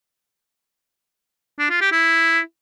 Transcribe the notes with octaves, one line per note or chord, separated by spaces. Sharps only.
D4
F4
G4
E4